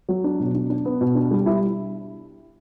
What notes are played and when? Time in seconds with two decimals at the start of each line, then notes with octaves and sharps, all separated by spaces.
0.09 F#3
0.24 D4
0.40 B2
0.54 D4
0.70 D4
0.85 B3
1.01 B2
1.15 D4
1.31 G3
1.46 E4